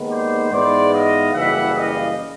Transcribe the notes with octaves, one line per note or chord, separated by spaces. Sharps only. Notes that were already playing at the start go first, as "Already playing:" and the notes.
Already playing: D#2 D#3 G#3 B3
C5 D5
G#2 E3 G#3 B3 C5 D5
D#5 F5
F#1 F#2 C#3 E3 G3 E5 F#5
D#5 F5